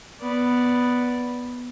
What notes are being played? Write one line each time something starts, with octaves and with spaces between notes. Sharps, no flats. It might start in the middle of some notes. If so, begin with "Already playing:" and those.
B3 D5